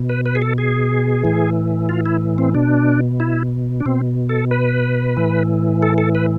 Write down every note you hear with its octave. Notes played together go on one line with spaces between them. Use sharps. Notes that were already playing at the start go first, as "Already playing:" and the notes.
Already playing: B2
B4
B4
G#4
A4
G#4
A2 E3
F4
E4
C4
B2 D4
E4
D4
B2 C4
A4
B4
A2 E3
A4
A4
B4